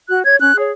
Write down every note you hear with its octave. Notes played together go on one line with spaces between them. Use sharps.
F#4 F#6
C#5 G#6
C#4 F#6
G#4 C#5